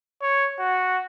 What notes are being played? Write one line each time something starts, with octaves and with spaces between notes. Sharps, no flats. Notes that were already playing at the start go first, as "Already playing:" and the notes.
C#5
F#4